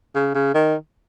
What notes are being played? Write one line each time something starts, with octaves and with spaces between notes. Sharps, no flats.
C#3
C#3
D#3